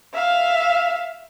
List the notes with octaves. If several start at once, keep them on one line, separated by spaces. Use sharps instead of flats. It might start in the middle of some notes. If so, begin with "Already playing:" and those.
E5 F5